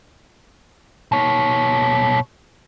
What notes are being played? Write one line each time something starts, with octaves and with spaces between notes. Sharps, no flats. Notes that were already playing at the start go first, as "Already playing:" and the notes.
B2 C#5